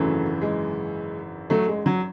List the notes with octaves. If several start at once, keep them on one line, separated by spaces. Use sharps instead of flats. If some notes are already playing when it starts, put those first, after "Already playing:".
Already playing: G#1 F#2 C#3 E3 F#3 A3
G#3
F#3 A3
G#3
F#3